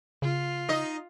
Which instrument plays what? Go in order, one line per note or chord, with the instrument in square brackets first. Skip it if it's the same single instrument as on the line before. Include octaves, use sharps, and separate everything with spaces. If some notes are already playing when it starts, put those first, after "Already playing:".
[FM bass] C#3 [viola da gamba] F4
[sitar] D#4 D#5